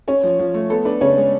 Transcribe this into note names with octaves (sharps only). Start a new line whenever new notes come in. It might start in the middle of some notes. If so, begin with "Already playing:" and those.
C#4 C#5
F3
F3
A3
B3 A4
D4 B4
C#3 C#4 C#5
G#3